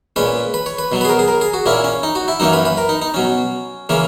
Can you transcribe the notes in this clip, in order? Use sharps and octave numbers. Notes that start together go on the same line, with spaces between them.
A#2 G#3 C#4 B4
B4
C#5
B4
B2 F#3 B3
B4
G#4
A#4
G#4
A#4
G#4
F#4
A#2 A#3 C#4 E4
C#4
D#4
F#4
E4
F#2 E3 A#3 C#4 D#4
B4
B4
A#4
D#4
D#4
B2 F#3 C#4
C#3 E3 A#3 C#4